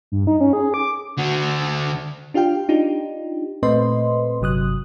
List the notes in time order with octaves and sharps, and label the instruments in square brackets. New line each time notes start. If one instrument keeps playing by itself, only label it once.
[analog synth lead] G2
D#4
C#4
G#4
D6
[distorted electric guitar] D3 F#4
[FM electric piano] D4 F4 G4 F5 G5
D4 D#4 F4 G4
A#2 A3 C4 B4 D#5 C6
G1 C3 F#3 D#6 F#6